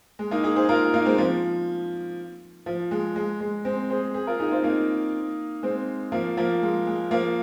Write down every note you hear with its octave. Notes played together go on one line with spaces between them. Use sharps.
G#3
A#3 D#4
D#4 G#4
G#4 C5
F4 A#4
A#3 D#4
G#3 C4
F3
F3
G#3
G#3
G#3
G#3 C4
G#4 C5
G#4 C5
F4 A#4
D#4 G#4
C4 F4
A#3 D#4
G#3 C4
F3 A#3
F3 A#3
G#3
G#3
F3 A#3